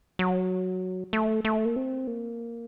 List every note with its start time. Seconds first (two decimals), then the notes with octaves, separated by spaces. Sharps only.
0.19 F#3
1.13 A3
1.45 A3
1.65 A#3
1.76 C4
2.07 A#3